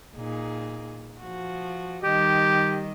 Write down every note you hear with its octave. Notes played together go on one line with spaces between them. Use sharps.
A#2 D#4 G#4
F3 F#4
D#3 G3 G4 D#5